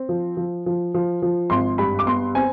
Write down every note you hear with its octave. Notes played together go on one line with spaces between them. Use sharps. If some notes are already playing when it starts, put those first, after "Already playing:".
Already playing: C4
F3
F3
F3
F3
F3
G#1 C6
G2 B5
D6
B3 C6
C4 G#5